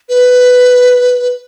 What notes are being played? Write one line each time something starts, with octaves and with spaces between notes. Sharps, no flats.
B4